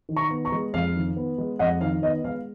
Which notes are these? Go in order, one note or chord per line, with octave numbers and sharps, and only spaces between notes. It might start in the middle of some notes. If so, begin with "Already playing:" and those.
D#3
A#5 C#6
B3
A#5 C#6
G#3
F2 F5
D#3
B3
G#3
F2 D#5 F#5
D#3 F5
B3 D#5
G#3 F5